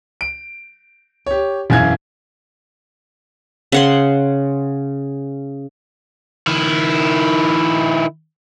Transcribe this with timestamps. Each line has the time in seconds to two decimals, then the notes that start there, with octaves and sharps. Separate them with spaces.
0.21 D7
1.26 G4 C#5
1.70 E1 F#2 E4 F5 G#6
3.72 C#3 F#5 C6
6.47 D#3 E4